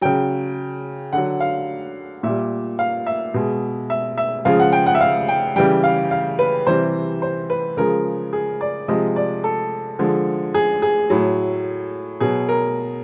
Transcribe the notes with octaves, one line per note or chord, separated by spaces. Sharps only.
C#3 F#3 G5
D3 F#3 F#5
F5
A#2 G3 E5
F5
E5
B2 G#3
E5
E5
C#3 F3 G#3 F5
F#5
G5
F#5
E5
F5
G5
C#3 E3 G3 G5
F5
F5
B4
C3 E3 G3 C5
C5
B4
C#3 F3 G#3 A#4
G#4
D5
C3 F3 G#3 D#5
D5
A4
D3 F3 G#3
G#4
G#4
A2 F#3
B2 F#3 G#4
A#4